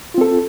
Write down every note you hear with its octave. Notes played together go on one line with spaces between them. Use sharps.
C4 F4 A4